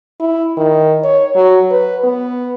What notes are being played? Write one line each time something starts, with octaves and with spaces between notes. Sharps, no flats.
E4
D#3
C#5
F#3
B4
B3